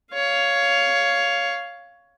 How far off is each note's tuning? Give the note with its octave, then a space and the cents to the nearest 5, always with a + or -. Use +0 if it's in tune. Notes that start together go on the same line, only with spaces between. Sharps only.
C#5 +15 F5 +0